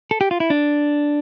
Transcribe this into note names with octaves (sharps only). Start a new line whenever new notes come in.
A4
G4
F4
E4
D4